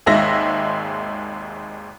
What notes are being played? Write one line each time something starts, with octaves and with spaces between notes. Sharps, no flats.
G#1 D#2 G#3 E5 A#6